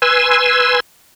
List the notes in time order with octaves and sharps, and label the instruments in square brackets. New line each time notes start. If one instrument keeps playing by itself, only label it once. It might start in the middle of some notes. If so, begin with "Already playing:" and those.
[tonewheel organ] B4 G#5 C6 E6